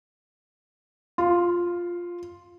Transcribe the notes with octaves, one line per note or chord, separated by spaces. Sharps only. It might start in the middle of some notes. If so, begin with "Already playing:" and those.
F4